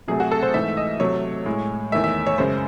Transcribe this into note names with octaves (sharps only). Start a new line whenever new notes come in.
C3 F#3 A3 G#4
F#4
A4
C5
G#2 E3 A3 E5
D#5
C3 F#3 A3 C#5
A2 G#3
E2 D#3 A3 E5
E5
C#5
F#2 C#3 G#3 C5